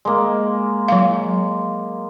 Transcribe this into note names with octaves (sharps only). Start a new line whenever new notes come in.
G#3 A#3
F#3 F5